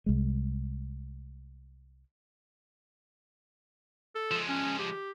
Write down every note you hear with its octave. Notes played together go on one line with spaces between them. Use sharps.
C2 G#3
A4
F3 G#3
C#4
G4